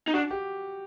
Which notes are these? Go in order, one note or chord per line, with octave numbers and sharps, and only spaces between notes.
D#4
D4 F#4
G4